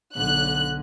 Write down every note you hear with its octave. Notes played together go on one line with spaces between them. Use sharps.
B1 D3 F#6